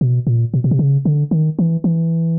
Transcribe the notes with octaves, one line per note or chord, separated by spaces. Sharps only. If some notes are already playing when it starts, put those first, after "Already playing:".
B2
A#2
B2
B2
C3
C#3
D3
D#3
E3
E3